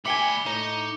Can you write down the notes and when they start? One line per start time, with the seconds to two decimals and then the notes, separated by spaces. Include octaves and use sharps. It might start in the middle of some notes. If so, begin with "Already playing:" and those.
0.06 D2 E5 G5 G#5 B5 D6 C#7 G7
0.46 A2 D#4